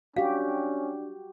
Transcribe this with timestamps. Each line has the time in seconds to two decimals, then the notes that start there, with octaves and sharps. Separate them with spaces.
0.16 C#4 D4 F#4 G4 F5